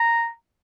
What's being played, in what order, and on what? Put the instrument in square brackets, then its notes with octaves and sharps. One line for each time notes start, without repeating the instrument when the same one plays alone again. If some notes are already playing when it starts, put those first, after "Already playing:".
Already playing: [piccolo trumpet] A#5